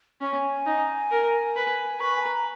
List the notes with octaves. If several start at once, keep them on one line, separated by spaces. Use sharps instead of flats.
C#4 G#5
D#4
A#4
B4
B4 C#6
G#5
A#5